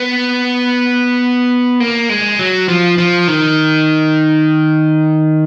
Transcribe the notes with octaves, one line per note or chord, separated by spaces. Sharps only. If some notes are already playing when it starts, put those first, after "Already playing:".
Already playing: B3
A#3
G#3
F#3
F3
F3
D#3